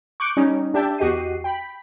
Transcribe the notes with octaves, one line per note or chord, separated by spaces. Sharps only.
C#6 D6 F#6 G6 C#7 D7
G3 C#4 D#4
D4 G4 E5 G5 A5
E2 F#4 G4 D#5 C7 D#7
G5 B5 B6